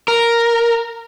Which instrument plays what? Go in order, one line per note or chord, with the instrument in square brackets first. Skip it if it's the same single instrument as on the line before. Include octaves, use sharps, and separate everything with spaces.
[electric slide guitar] A#4